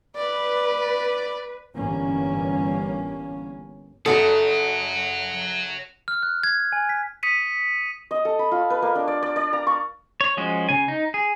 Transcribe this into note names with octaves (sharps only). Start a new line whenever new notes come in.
B4 D5
G1 E3 A#3 C#4
F#1 F#4 A4 C#5 F#5 D#6
F6
F#6
G#6
G#5
B6
D#6 B6 C#7 D#7
D#5
A4
B5
F4
B4
A#3
D4
D5
D5
D5
A#5
C#6
C#5
F3 G#3 C#4 F#4
C#3 G#5
D#4
G#4